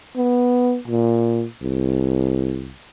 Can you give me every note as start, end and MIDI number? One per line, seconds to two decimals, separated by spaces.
0.17 0.77 59
0.88 1.45 46
1.63 2.73 36